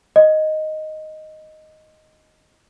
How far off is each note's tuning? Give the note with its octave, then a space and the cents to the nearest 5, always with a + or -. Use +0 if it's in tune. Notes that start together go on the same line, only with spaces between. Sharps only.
D#5 +0